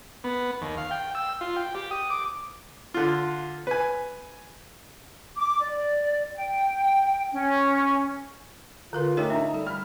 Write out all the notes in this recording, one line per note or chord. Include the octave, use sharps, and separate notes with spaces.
B3
D#2
F5
G5
E6
F4
G5
G4
D#6
D6
D3 F4
B4 G#5
D6
D5
G5
C#4
D3 F4 A#4 B4
A3 C#4 D#4 G4 A4 A#4 C#5
D4 E5 A#5
G3 A4
B5 F6